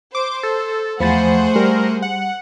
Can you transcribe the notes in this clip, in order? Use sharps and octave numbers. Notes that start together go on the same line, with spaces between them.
C5 D6
A4
E2 F3 A3 G#4 C5 F#5 B5 A6
G3 A#4
F#5